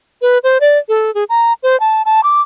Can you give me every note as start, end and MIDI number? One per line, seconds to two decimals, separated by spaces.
0.22 0.38 71
0.43 0.58 72
0.60 0.78 74
0.89 1.13 69
1.14 1.24 68
1.29 1.53 82
1.63 1.79 72
1.80 2.02 81
2.05 2.21 81
2.24 2.41 86